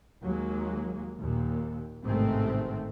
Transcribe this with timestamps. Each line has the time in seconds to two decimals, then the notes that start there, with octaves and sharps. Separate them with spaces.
0.24 D#2 F#3 G#3 A#3
1.19 D#2 A#2
2.03 A1 G#2 C3 D#3 A3 C4